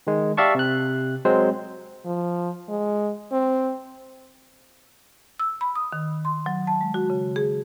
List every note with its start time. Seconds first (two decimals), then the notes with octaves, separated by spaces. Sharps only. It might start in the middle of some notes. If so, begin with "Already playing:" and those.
0.07 D#3 G#3
0.37 G4 D5 E5 F5 A5 C#6
0.55 C3 F#6
1.25 F#3 G#3 C4 C5
2.05 F3
2.69 G#3
3.32 C4
5.39 E6
5.61 B5
5.75 D#6
5.92 D#3
6.25 C6
6.46 F#3
6.67 A5
6.81 G#3
6.94 F#4
7.10 C#3
7.36 G#4